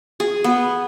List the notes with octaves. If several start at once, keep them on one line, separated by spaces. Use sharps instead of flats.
G#4
B3